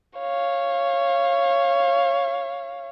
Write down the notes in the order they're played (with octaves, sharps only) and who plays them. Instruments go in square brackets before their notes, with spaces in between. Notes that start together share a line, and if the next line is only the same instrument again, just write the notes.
[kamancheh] C#5 F5